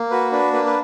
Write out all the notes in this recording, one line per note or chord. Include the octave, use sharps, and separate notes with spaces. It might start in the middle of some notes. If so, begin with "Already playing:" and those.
Already playing: A#3
F#4 B4
D4 B4
A#3 B4
B4